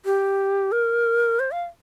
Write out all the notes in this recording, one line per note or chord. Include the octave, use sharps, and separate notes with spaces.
G4
A#4
C5
F5